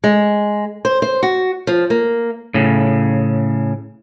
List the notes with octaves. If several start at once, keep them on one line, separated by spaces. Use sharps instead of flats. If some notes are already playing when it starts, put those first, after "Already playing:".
G#3
C5
C5
F#4
F3
A#3
A2 C#3